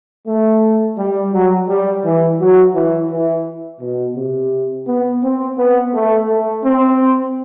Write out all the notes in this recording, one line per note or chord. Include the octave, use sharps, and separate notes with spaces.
A3
G3
F#3
G3
E3
F#3
E3
E3
B2
C3
B3
C4
B3
A3
A3
C4